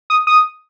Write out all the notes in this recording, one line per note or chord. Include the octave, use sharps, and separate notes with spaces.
D#6
D#6